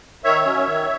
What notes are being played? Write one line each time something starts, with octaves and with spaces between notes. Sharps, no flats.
D#3 C#5 E5
F#3 C#4
D#3